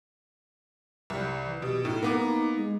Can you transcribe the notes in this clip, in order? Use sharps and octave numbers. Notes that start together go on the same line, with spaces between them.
C2 G3
E3
B2 G4
A2 D#4
A#3 B3 D#4 D6
G#3